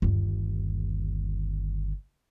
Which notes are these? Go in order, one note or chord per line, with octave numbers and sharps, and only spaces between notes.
G1 D#2